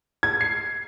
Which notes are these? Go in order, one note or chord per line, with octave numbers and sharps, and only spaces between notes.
G#6
C7